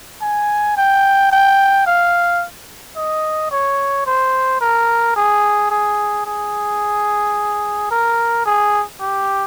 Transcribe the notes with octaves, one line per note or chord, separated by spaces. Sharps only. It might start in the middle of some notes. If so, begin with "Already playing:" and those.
G#5
G5
G5
F5
D#5
C#5
C5
A#4
G#4
G#4
G#4
A#4
G#4
G4